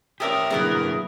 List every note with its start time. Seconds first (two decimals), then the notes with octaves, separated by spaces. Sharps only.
0.20 C#4 G4 A#4 D5 E5 D#6
0.50 D3 F#3 A#3 B3 E4 G#4 B4